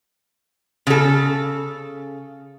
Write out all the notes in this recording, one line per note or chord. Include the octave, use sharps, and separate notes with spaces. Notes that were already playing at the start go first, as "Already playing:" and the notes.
C#3 A4